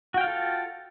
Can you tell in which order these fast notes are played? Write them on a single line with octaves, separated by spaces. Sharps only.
F#4 G5 F5 F4 A4